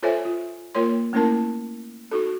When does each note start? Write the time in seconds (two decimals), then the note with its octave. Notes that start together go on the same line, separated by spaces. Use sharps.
0.03 F4 A4 C5 C#5 E5 G#5
0.25 F4
0.75 A#3 F4 A#4 C#5 C6
1.13 A3 A#3 C#4 E4 A#4 A5
2.11 D#4 F#4 A4